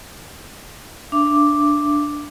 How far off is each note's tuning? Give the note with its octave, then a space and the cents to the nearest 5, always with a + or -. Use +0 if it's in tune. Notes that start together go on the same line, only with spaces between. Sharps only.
D4 +0 E5 +35 D6 +0